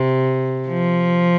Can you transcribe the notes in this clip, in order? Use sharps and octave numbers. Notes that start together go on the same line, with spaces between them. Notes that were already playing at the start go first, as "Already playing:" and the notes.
Already playing: C3
F3